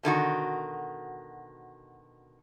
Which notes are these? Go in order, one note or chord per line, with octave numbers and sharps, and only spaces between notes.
B2 D3 D#3 F#4